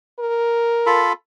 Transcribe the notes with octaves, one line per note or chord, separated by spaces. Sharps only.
A#4
F4 A4 B5